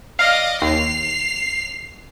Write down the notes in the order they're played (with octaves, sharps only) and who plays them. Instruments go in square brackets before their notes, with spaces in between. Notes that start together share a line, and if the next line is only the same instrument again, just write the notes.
[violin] D5 D#5 [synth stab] F5
[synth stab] D#2 [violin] C7 F7